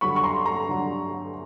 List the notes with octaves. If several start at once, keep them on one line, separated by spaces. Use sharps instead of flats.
G2 D3 F#3 B5 C#6
C#6
A#5 C6
A#5 C6
G2 D3 F#3